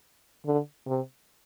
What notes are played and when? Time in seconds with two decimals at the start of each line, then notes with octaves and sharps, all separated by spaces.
0.46 D3
0.86 C3